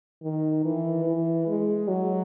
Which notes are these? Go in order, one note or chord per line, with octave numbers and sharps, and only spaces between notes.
D#3
E3
E3
G#3
F#3